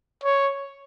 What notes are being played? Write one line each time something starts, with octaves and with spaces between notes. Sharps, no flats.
C#5